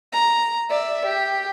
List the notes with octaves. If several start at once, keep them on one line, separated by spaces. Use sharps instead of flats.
A#5
D5 E5
G4